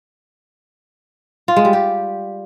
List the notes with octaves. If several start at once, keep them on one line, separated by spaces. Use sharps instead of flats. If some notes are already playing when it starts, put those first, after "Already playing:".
F4
G#3
G3
G4